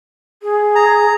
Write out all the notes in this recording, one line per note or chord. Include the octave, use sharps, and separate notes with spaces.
G#4
A#5